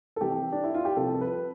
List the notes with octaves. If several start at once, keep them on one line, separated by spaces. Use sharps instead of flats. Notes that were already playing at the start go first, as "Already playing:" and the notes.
A4
C2 C3 E3 G3 G4
D4
E4
F4
G4
C2 C3 F3 A4
A4
B4